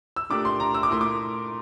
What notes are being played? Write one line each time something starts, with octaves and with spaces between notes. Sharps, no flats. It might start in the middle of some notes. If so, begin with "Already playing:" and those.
E6
A#2 A3 D4 G4 A#4 D6
C6
A#5
E6
D6
A#2 A3 E4 A#4 C6
D6